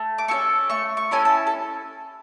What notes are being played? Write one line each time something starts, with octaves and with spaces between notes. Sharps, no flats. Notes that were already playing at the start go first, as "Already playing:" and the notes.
Already playing: A3
D6
C#4 E4 A4 C#6
A3 C#6
C#6
C#4 E4 A4 G#5
A5
A4